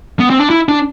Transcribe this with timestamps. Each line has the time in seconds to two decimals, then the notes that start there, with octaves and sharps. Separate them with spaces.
0.20 B3
0.30 C4
0.39 D4
0.50 E4
0.69 D4